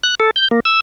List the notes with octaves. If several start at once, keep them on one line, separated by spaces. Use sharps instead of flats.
F#6
A4
G6
A#3
E6